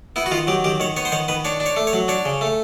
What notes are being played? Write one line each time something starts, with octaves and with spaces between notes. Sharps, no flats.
B3 E4
F#4
D#3 F4
F#3 G4
D#3 G4
D#3 C#5
B3 C#5
C5
D#3 C#5
D#3 B4
D4 C#5
D4
C#5
A3
C#5
F#3
D4 C#5
C#3
A3